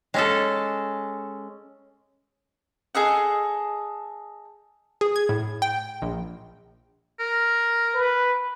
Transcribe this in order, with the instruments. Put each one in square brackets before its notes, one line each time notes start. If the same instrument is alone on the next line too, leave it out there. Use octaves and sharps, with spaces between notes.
[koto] G#3 C#4 A4
[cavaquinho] G#4 A4 D#5 F#5
[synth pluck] G#4
G#6
A2
G5
A#1
[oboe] A#4
[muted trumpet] B4